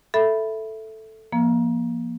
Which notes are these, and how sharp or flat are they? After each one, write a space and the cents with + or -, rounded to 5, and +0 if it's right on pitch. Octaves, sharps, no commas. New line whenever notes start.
A4 +0 E5 +0 B5 +0
F3 -15 A#3 +25